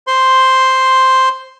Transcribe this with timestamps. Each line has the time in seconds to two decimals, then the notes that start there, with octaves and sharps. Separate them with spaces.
0.07 C5 C6